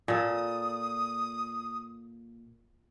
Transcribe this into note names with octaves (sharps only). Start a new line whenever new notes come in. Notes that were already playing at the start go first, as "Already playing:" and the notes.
A#2 A4 D#6